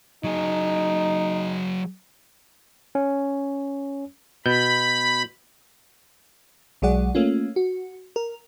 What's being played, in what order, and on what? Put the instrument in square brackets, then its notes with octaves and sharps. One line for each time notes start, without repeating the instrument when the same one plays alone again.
[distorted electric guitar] F#3 G#4 [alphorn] D#4
[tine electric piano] C#4
[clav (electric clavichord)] B2 [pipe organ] B5 [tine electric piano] G6
[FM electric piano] B1 F#3 G#3 G#4 D5 F#5
A3 A#3 C#4 F4
F#4
A#4